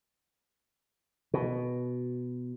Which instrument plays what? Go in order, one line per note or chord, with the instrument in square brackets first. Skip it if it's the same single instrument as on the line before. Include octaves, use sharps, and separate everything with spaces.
[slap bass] B2